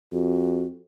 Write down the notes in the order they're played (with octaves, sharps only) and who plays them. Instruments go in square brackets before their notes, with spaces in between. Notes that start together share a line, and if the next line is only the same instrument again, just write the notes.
[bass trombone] F2 [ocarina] F#4